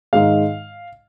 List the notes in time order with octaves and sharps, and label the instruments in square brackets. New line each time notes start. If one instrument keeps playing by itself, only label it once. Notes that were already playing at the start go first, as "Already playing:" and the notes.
[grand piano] G#2 D#3 G#3 F5